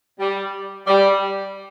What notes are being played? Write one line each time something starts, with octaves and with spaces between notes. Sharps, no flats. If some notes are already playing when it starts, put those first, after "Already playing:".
G3
G3